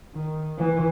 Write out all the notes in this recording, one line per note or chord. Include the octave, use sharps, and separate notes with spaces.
D#3
E3